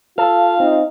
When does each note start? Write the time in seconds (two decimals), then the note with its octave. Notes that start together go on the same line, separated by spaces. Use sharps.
0.18 F4 A4 F5
0.60 C4 D#4